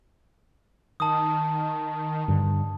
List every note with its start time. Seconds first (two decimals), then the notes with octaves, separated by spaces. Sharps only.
1.00 D#3 A5 D#6
2.28 G2 D3